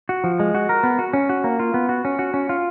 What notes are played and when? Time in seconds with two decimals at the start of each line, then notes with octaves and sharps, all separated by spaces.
0.09 F#4
0.24 F3
0.40 G#3
0.55 F#4
0.69 A#4
0.83 B3
0.99 F#4
1.13 C#4
1.29 F#4
1.44 A#3
1.60 F4
1.74 B3
1.89 F#4
2.05 C#4
2.19 F#4
2.34 C#4
2.49 F4